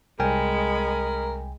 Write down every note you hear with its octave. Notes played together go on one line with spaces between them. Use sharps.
C2 G#3 A#4 G5 G#5 B5